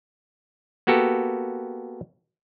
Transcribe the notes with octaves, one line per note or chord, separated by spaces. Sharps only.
A#3 B3 F#4 G4 A4